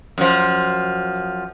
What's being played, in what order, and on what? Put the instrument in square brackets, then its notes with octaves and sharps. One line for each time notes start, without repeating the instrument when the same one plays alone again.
[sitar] F#2 F3